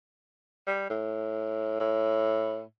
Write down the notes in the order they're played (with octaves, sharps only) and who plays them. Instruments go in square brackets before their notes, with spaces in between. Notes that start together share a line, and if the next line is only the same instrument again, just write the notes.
[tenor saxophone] G3
A2
A2